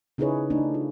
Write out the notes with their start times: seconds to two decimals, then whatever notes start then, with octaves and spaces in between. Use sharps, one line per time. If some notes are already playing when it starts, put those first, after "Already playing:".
0.18 C#3 D#4 E4 G#4 B4 C#5
0.50 A3 D4 D#4
0.74 F4